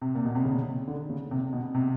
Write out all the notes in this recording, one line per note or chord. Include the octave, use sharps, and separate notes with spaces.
C3
A#2
B2
C3
C#3
D3
C#3
C3
B2
C3